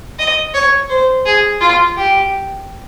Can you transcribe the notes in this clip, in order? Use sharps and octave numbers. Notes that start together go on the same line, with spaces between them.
D#5
C#5
C5
G#4
F4
G4